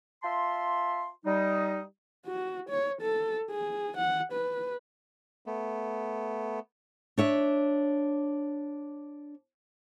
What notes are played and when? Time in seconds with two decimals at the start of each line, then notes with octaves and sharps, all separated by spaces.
0.24 F4 E5 A5 C6
1.26 G3 D#4
2.26 F#4
2.69 C#5
3.01 A4
3.50 G#4
3.97 F#5
4.32 B4
5.46 A3 B3
7.18 D4 C#5 E5